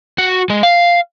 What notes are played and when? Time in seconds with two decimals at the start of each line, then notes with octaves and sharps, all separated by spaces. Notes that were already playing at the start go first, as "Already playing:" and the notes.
0.18 F#4
0.50 G#3
0.63 F5